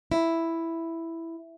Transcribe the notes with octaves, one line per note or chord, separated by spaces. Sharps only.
E4